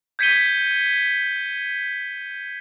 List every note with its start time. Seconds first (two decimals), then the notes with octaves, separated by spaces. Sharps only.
0.19 G6 G#6 B6 C#7 D#7 G7